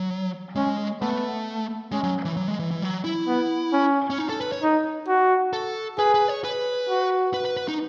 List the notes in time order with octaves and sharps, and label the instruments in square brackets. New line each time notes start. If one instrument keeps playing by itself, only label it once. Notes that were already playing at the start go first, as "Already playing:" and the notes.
Already playing: [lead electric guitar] F#3
[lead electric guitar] G#3 [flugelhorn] C#4
[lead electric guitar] A3 [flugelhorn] B3
[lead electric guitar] G#3 [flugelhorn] C#4
[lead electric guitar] F#3
E3
F#3
G#3
E3
E3
F#3
E4
[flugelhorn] B3
C#4
[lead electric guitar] C#4
D#4
A4
B4
C#5
[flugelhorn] D#4
F#4
[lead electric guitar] A4
[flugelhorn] G#4 [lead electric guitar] B4
[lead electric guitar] B4
C#5
B4
[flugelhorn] F#4
[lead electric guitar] B4
B4
B4
D#4